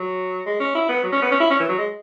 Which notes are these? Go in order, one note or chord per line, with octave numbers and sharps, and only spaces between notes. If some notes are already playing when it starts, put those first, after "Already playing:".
Already playing: F#3
G#3
C#4
E4
B3
F#3
C#4
B3
C#4
E4
C#4
E3
F#3
G#3